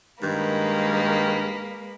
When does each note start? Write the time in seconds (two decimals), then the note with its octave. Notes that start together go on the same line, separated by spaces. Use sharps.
0.23 G2 D#3 G#3 A#3 B4